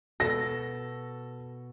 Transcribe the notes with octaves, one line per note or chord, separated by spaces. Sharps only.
B2 A4 A#6